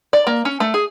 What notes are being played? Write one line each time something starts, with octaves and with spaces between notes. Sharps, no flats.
D5
A#3
C#4
A3
G#4